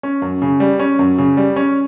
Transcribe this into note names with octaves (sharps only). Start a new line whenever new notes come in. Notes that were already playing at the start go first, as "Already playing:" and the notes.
C#4
F#2
C#3
G3
C#4
F#2
C#3
G3
C#4